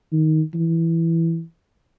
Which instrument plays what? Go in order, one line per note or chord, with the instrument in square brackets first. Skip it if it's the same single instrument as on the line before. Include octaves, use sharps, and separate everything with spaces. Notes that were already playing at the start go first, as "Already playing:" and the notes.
[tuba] D#3
E3